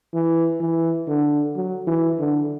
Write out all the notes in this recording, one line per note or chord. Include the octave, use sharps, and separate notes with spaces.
E3
E3
D3
F#3
E3
D3